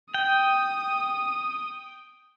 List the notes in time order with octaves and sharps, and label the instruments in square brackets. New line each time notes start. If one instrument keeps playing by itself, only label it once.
[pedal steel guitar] G5 [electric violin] D#6